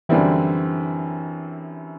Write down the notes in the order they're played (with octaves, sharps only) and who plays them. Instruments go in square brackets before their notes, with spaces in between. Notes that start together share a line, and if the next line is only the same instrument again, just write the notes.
[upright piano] F#2 D3 G3 C4 E4 [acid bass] E3